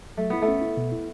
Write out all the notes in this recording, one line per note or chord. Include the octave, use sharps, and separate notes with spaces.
F#3 A3
B3 E4
A3
C#4
E4
B2
E4